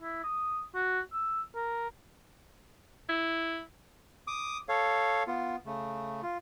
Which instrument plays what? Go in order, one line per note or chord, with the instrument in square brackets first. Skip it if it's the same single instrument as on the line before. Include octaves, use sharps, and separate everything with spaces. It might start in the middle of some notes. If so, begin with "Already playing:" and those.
[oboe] E4
D#6
F#4
E6
A#4
[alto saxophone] E4
[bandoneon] D6 D#6
A4 C#5 F5
B3 F4
C#3 A3
F4